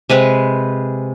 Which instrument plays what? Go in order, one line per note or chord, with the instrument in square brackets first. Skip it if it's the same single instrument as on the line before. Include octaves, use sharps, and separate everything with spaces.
[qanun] C3 G#3 B4